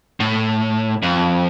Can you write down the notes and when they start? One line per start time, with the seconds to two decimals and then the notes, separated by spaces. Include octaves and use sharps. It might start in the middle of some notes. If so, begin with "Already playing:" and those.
0.20 A2
1.03 F2